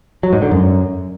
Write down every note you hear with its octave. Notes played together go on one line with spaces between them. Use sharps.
F#3
G#2
D3
F#2